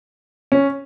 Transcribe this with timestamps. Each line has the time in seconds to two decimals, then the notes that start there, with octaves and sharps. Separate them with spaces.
0.52 C#4